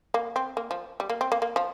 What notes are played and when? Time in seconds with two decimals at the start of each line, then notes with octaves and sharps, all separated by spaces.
0.14 A#3
0.36 C4
0.57 A#3
0.71 F3
1.00 G3
1.10 A#3
1.21 C4
1.32 A#3
1.42 A#3
1.56 F3